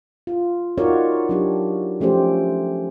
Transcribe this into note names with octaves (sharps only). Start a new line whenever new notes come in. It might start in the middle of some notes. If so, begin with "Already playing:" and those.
F4
D#4 F4 F#4 A#4 C#5 D5
F#3 D4 G4
F3 A3 C#4 G4 C5